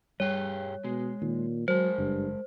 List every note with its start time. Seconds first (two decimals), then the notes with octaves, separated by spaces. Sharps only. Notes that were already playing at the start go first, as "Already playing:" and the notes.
0.20 G2 G3 G4 G#4 C#5
0.84 B2 G#3
1.22 A#2 D#3
1.68 F#3 G#3 A#4 C5
1.98 F#1 G2